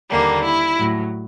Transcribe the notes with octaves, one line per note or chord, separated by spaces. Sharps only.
D#2 D3 G3 A#3
E4
A2 F#3